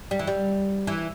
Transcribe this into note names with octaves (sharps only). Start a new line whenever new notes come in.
G3
E3
G3
E3